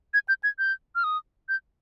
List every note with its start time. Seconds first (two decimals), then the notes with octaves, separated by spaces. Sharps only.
0.14 G#6
0.29 G6
0.43 G#6
0.59 G6
0.95 F6
1.04 D#6
1.49 G6